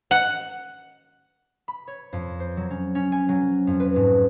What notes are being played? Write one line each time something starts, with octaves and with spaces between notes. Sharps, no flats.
F#5
B5
C#5
F2
C5
F#3
C#4
C#4
G#5
F#3
F2
B4
G#2